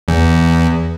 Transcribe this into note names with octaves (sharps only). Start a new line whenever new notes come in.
E2